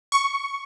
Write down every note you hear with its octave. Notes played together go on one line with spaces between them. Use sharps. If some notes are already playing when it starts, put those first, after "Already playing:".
C#6